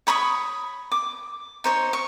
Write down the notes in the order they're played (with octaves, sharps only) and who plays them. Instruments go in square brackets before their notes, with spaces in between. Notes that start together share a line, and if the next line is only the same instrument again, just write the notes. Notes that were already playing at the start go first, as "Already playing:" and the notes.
[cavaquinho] C#5 B5 C#6 D#6
D6
D#4 C5 C#5
C#6